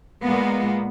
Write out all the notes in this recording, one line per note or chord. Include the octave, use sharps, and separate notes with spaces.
A#2 G#3 A#3 B3